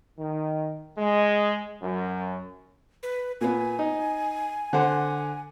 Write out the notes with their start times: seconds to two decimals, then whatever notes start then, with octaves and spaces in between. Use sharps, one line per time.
0.17 D#3
0.97 G#3
1.81 F#2
3.03 B4
3.41 A#2 B3 G#5
3.79 D#4
4.73 D3 C5 F#5